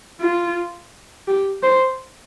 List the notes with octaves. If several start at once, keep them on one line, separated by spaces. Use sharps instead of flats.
F4
G4
C5